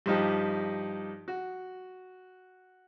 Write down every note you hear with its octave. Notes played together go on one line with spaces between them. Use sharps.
G2 F3 D#4 G4
F#4